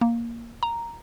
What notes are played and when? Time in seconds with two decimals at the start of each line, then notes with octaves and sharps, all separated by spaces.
0.01 A#3
0.63 A#5